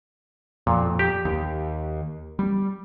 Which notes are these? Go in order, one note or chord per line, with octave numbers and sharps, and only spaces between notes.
F2 A#2
G4
D#2
G3